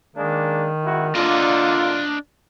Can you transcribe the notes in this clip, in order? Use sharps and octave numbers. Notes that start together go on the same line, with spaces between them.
D#3 G#3 A#3 D4
G#1 E4 F#4
D3 A#3 D4 F4 D#5